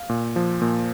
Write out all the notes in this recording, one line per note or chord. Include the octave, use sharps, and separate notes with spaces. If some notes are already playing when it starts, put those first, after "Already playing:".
Already playing: F5
A#2
F3
A#2